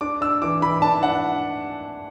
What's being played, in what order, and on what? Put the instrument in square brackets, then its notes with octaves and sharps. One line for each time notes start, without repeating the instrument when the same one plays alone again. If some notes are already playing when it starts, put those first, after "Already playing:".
[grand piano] D4 D6
D4 E6
E3 D6
E3 B5
D4 A5
D4 F#5